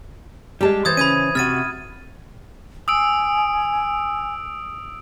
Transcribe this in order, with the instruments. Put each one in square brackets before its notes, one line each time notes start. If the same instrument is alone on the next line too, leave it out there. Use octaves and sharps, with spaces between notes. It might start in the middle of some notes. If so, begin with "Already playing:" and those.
[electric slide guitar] G3 G#3 [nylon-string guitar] G4 A5
[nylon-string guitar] E3 C5 [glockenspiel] D#6 G#6 A6
[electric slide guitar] C#3 C#4 [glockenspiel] B5 G#6 D#7
[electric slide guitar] C3 F#4 [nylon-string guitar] E5 [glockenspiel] F6 A6 D#7
[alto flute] G#5 [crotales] D#6 E6 D7